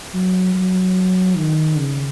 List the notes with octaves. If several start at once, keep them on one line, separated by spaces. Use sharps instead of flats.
F#3
F#3
D#3
C#3